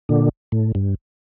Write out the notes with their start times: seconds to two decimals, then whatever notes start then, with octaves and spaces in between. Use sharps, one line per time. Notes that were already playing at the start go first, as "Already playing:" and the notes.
0.09 A#2 D3
0.52 A2
0.75 G2